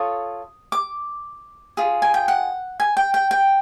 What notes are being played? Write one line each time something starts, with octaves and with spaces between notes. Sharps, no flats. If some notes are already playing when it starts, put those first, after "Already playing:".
Already playing: F4 A4 C#5 D#6
D6
F4 G#4
G#5
G5
F#5
G#5
G5
G5
G5